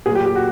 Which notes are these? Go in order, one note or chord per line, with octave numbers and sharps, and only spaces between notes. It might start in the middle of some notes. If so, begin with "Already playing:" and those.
A#2 F#3 A#3 G#4
G4
G4
F#4